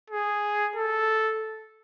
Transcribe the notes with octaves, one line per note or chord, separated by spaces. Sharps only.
G#4
A4